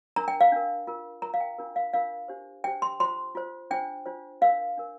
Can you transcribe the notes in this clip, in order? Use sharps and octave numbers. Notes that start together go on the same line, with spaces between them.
D4 A#4 A#5
G5
F5
D4 A#4
F4 A#4
F4 A#4 A#5
F5
G5
D4 F4 A#4
F5
D4 F4 A#4 F5
D4 G4 C5
D4 G4 C5 G5
C6
F4 C5 C6
F4 C5
D4 F4 C5 G5
D4 F4 C5
D4 A#4 F5
D4 A#4